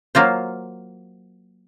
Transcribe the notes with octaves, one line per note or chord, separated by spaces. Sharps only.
F#3 A#3 F4 C5